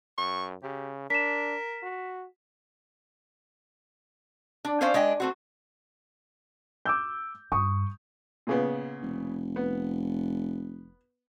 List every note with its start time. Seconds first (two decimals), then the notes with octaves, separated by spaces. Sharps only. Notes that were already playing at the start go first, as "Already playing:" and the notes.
0.18 F#2 C#6
0.63 C#3 G4
1.10 D4 A#4 B6 E7
1.83 F#4
4.65 D4
4.81 C4 C#4 C5 D5 F5
4.94 G#3 D4 D#5 G5
5.20 A3 C4 F#4
6.85 D6 E6 G6
7.52 G2 C#6 D#6
8.47 A#2 C#3 B3
9.02 F1
9.56 B3